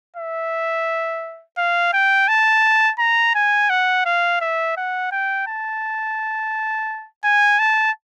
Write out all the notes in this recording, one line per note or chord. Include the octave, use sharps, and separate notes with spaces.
E5
F5
G5
A5
A#5
G#5
F#5
F5
E5
F#5
G5
A5
G#5
A5